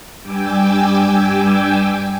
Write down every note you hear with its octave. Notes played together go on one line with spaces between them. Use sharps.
G2 G3 G5 G#5 D6 E6